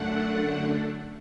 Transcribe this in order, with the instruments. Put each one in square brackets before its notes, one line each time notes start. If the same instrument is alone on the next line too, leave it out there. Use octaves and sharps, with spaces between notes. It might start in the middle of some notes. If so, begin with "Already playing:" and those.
Already playing: [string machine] F#2 D3 A3 D4 F#5